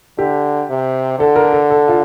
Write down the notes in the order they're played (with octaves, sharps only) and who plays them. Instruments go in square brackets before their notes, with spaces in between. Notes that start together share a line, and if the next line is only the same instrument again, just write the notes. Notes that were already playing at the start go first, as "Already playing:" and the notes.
[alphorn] D3 [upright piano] G4
[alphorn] C3
[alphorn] D3 [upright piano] A4
[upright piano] A#4
A4
A4
F4